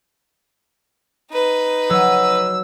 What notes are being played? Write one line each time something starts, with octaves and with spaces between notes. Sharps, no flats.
D#4 B4
F#3 E6